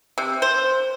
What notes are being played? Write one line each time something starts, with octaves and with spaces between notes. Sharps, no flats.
C3
C5